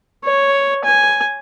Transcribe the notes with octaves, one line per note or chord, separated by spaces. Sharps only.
C#5
G#5